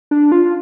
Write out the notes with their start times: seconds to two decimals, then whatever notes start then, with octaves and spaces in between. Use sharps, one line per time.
0.11 D4
0.32 F4